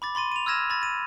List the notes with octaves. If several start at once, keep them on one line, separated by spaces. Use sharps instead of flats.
B5 D6 A6
B5 C6 A6 D#7
D#7 F7
E6 F6 G#6 A#6 E7
B5 A6
A6 D#7